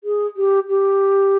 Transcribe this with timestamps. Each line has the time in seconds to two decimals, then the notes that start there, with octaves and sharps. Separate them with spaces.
0.04 G#4
0.37 G4
0.69 G4